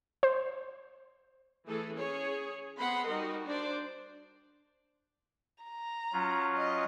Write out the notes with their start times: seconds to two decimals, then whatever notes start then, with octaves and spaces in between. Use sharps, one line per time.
0.23 C5
1.66 E3 A3 G#4 A4
1.95 C#4 G#4 C#5
2.78 B3 C4 G#4 F#5 B5 C6
3.08 G3 D#4 F#4 A#4 D#5
3.46 D4 C5 D5
5.64 A#5
6.13 F#3 C#4 F4
6.57 D#5